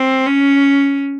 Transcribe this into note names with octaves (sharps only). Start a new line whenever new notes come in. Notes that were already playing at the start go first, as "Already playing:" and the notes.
Already playing: C4
C#4